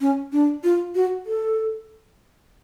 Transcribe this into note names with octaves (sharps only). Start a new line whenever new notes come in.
C#4
D4
F4
F#4
A4